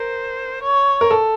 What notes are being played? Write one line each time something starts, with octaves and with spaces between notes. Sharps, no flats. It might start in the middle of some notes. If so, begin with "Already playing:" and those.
Already playing: A#4 C5
C#5
A#4
A4